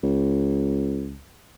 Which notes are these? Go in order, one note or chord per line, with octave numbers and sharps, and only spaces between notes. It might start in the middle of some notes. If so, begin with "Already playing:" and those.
C#2